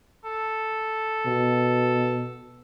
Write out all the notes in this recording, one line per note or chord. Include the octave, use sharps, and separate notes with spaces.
A4
B2